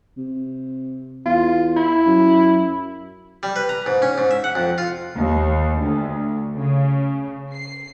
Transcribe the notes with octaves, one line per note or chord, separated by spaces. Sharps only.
C3
E2 F4
E4
F#2
G3
B4
A#5
G#2
C#4
G#2
E5
F#5
F2
F4
D#2
D2
C#3
C7